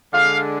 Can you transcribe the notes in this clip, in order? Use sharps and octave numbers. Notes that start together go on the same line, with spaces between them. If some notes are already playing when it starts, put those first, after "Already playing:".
D3 G#3 D4 F5